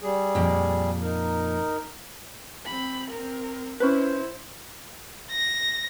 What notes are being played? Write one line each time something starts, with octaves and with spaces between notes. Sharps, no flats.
G3 G#4
F2 A#2
D#4 A#4
C4 B5
C4 A#4
C#4 E4 B4 C5
A#6